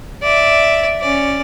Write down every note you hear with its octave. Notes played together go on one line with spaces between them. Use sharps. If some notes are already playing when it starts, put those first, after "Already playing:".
D5 E5
C#4 D5